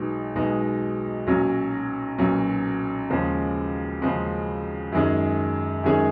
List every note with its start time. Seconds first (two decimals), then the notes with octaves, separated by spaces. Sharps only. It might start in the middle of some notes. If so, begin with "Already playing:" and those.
Already playing: B1 B2 G#3 D#4
0.35 B1 B2 G#3 D#4
1.27 B1 A#2 F#3 C#4
2.18 B1 A#2 F#3 C#4
3.10 D#2 C#3 F3 G#3 C#4
4.01 D#2 C#3 F3 G#3 C#4
4.92 F#2 D#3 G#3 C#4 G#4
5.84 F#2 D#3 G#3 C#4 G#4